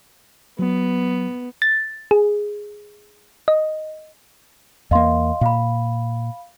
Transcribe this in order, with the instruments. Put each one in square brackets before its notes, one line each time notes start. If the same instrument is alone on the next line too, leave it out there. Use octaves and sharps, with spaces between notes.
[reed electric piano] F#3 [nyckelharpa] B3
[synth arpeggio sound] A6
G#4
D#5
[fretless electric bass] E2 A#3 [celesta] D#5 F5 C6
[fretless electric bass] A#2 [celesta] F5 B5